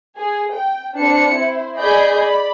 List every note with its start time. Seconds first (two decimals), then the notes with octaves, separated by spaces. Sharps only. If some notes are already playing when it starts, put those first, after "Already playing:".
0.15 G#4
0.52 G5
0.95 C4 D4 B4 C#7
1.33 E4 C5
1.78 G#4 D5 D#5 B5 G6
2.20 D5 B5